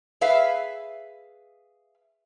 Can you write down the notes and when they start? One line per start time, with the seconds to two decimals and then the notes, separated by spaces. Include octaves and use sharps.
0.21 G#4 B4 E5 F5